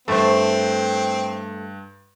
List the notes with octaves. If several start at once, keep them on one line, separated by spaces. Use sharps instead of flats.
G2 A3 C4 C5